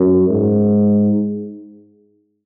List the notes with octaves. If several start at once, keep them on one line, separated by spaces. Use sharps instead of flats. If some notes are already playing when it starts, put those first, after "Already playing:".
Already playing: F#2
G#2